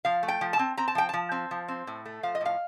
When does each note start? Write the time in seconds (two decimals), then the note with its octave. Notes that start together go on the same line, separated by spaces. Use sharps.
0.05 F3 F5
0.23 A3
0.28 G5
0.41 F3
0.53 A5
0.59 C4
0.77 C4 A#5
0.88 A5
0.95 F3 G5
1.09 F3 A5
1.32 C4
1.51 F3
1.68 C4
1.87 A2
2.06 A3
2.23 F3 F5
2.35 D#5
2.41 A2 F5